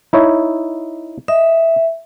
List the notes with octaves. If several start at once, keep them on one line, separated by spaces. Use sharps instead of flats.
D#4 E4 C#5
D#5 E5